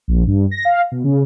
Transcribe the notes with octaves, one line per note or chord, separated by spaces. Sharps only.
A#1
G2
A#6
F5
B2
C#3